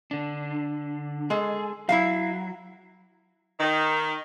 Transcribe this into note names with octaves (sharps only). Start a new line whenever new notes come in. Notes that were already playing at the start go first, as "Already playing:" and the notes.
D3 D4
G#3 G#4 A4
F#3 E4 E5 F5
D#3